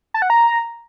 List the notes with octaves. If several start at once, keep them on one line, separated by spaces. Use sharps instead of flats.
A5
F#5
A#5